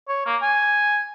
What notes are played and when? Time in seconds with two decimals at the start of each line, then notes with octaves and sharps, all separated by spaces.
0.09 C#5
0.26 A#3
0.42 G#5